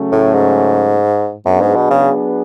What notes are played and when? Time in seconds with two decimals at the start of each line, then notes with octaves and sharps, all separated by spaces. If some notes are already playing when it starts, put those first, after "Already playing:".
Already playing: C#3 F#3 A3 C#4
0.12 A2
0.34 G#2
1.46 F#2 F#3 B3 D4 G#4 B4
1.61 G#2
1.76 B2
1.91 C#3